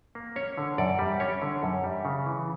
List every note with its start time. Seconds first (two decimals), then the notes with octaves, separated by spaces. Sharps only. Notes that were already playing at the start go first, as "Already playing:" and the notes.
0.15 A#3
0.36 C#4 C#5
0.57 D3
0.78 F#2 D5
0.99 G3
1.20 C#4 C#5
1.42 D3
1.63 F#2
1.84 G3
2.05 C#3
2.26 E3